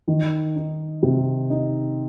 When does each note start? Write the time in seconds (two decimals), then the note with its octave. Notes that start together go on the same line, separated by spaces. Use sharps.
0.08 D#3
0.56 D#4
1.03 C3
1.50 D#4